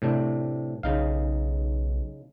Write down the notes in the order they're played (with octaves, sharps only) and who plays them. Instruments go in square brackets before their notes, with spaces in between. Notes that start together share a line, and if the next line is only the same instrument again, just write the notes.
[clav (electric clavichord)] A2 C3 D4
[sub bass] B1 [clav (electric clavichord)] C#3 D#4 F5